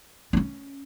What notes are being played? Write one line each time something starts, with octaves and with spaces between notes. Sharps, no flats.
D4
C#4